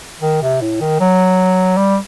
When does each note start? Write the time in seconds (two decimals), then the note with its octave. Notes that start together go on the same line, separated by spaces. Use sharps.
0.22 D#3
0.42 C3
0.62 A2
0.81 D#3
1.00 F#3
1.77 G3